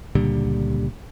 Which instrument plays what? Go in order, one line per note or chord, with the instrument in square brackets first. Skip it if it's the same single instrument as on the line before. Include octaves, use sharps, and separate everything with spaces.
[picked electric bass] C#2 A#2 D3 G3